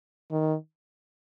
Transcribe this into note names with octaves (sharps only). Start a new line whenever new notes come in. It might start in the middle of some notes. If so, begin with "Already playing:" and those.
D#3